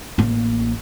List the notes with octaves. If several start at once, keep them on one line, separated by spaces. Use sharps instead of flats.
A1 A#3